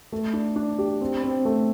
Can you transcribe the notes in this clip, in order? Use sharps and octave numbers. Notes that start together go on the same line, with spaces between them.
A3
D4
D4
G4
C4
C4
A3